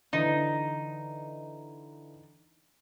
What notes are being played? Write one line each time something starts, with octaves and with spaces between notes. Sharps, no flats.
D3 E3 D#4